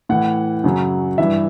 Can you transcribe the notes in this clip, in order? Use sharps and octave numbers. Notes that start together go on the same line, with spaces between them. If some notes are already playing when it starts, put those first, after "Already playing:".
A2 E3 F#5
F#2 C#3 F#3
G2 E3 E5